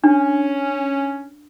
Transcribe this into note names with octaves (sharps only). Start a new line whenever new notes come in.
C#4 D4